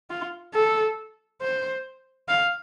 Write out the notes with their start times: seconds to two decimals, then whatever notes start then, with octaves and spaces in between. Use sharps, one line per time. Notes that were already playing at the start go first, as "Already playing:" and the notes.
0.10 F4
0.54 A4
1.41 C5
2.28 F5